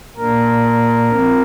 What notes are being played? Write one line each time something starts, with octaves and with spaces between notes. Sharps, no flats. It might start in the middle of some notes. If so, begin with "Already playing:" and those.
A#2 A#3 D4 A#4
F3 C4